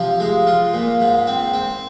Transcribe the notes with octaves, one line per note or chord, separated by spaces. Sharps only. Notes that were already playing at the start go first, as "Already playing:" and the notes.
Already playing: C3 F3
G#3
F4
A#2
G#2
C4
C4